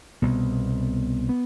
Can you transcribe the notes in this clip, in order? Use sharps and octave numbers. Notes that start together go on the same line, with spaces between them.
C2 B2 B3
B3